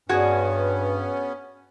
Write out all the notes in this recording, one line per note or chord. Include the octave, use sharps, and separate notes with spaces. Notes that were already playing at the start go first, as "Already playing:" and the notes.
G2 B3 C#4 F#4 G#4 D5